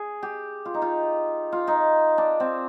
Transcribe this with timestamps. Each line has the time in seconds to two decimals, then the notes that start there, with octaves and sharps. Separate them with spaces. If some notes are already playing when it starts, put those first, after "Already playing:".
Already playing: G#4
0.23 G4
0.65 F4
0.74 D#4
0.82 F4
1.52 F4
1.67 D#4
2.18 D4
2.40 C4